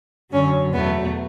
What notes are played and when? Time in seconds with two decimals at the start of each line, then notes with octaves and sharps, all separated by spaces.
0.32 F#2 D3 F#3 C#4
0.73 E2 B2 F#3 A3 B3